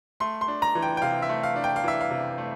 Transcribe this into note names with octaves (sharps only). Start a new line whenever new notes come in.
A3 C6
C6
D4
A#5
E3
G5
G5
C3 F5
E5
A3
F5
D4
G5
F5
E3 E5
F5
C3
A3